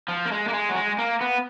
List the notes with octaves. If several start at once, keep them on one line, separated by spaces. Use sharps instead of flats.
F3
A#3
G#3
A#3
G#3
F#3
G#3
A#3
B3